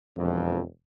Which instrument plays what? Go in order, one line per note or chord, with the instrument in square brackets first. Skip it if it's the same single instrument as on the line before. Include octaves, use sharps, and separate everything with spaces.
[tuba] E1 [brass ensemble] F2